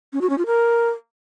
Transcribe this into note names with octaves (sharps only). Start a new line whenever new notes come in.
C#4
F#4
C#4
F4
A#4